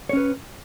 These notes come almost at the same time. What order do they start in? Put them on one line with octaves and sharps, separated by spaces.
C#5 C#4 B4